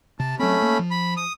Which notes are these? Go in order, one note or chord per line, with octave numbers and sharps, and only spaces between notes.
C3 A5
F#3 A3 C4 C#4 B5
A#3
F3
B5
D#6